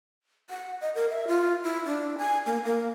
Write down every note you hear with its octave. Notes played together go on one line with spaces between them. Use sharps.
F#5
D#5
A#4
E5
F4
E4
D4
G#5
A#3
A#3